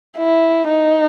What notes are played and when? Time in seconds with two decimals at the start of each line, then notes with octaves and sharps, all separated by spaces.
0.17 E4
0.68 D#4